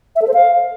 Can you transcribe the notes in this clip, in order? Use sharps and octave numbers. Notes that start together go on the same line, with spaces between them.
E5
A4
C5
F5